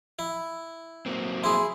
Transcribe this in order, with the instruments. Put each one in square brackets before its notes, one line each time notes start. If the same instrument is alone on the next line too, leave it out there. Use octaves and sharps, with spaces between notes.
[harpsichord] E4
[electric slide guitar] F#3 A#3 C4
[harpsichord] E4 G#4 [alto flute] C6